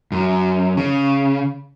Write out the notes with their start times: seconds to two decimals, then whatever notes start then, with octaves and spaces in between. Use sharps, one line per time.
0.12 F#2
0.77 C#3